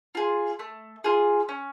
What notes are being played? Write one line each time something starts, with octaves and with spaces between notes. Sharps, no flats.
F4 G#4
A3
F4 G#4
C#4